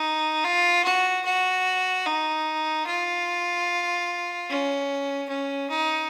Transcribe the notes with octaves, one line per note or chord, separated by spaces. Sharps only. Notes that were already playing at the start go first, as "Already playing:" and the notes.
Already playing: D#4
F4
F#4
F#4
D#4
F4
C#4
C#4
D#4